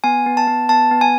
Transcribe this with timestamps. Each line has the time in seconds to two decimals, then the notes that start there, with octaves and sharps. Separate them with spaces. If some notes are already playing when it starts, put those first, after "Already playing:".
0.04 B3 G#5
0.26 B3
0.37 A5
0.47 B3
0.69 B3 A5
0.91 B3
1.01 G#5